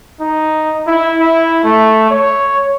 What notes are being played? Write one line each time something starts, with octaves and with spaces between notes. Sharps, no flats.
D#4
E4
E4
A3
C#5